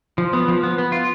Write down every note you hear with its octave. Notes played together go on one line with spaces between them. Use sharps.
F3
B3
F3
B3
B3
F4